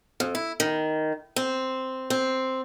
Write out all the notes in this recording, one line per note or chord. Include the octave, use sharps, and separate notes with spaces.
F2
E4
D#3
C4
C4